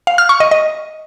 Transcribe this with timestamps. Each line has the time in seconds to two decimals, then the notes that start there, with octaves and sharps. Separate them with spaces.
0.07 F5
0.18 F6
0.29 C#6
0.40 D#5
0.51 D#5